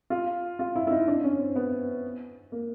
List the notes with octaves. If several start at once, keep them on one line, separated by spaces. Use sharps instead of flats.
F4
F4
E4
E4
D#4
D4
C#4
C4
B3
A#3